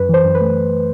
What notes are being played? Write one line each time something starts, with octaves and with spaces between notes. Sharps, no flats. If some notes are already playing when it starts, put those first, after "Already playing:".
Already playing: F#2 B4
E3 C5
F#2
B4
A3